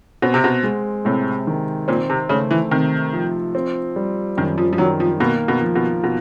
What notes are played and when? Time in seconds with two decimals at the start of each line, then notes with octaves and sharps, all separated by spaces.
0.22 B2 C4
0.34 C3
0.44 B2
0.63 G#3
1.05 A2 C3
1.47 D#3
1.88 A#2 C4
2.10 C3
2.29 C#3 A3
2.51 E3
2.71 C3 D#3
3.13 F3
3.55 C4
3.96 G3
4.37 F#2 D#3
4.58 F3
4.73 F3
4.78 D#3 F#3
5.00 F3
5.20 B2 A#3
5.48 B2
5.61 F3
5.75 B2
6.04 B2